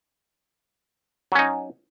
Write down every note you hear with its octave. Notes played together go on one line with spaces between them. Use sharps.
F#3 C#4 D#4